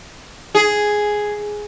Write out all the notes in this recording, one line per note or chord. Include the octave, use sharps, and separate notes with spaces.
G#4